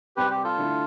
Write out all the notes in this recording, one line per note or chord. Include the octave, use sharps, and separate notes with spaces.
C3 G3 C4 G4 B4
G4
F4 A4
D3 A3 E4